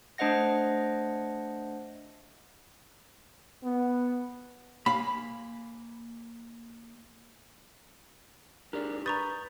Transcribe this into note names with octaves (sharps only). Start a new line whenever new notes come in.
A3 D4 C5 D#5 F#5 A#6
B3
A#3 F5 G#5 B5
D4 G4 G#4 A#4 D5
B4 A#5 B5 C#6 D#6 G6 A6